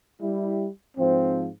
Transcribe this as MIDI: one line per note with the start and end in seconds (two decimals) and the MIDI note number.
0.22 0.68 55
0.22 0.68 64
0.98 1.49 44
0.98 1.49 53
0.98 1.49 60